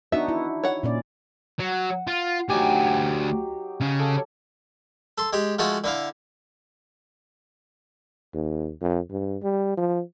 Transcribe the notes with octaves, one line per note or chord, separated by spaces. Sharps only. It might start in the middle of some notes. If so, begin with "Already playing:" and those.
B3 D4 D#4 F#4 E5
E4
C#5 F#5
A#2 C#4 D5
F#3 F#5
F4
D2 F#3 D#4 G4 G#5
C#3 C#4
A4
A4 C6
G#3 G4
F3 G#3 A3 F4 F#4
D3 E4 F5
D#2
F2
G2
G3
F3